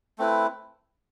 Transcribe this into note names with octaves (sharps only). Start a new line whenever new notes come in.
A3 C4 E4 B4